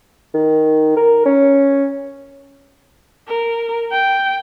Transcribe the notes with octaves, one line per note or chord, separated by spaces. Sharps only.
D#3
A#4
C#4
A#4
G5